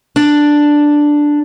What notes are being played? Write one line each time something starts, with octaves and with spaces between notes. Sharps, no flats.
D4